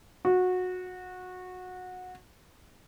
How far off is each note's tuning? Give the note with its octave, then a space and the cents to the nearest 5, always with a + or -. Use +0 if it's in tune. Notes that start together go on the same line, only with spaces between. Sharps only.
F#4 -20